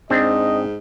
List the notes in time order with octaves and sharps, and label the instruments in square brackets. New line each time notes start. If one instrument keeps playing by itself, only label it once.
[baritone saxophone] G#2 [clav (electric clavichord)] C4 D4 [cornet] D#5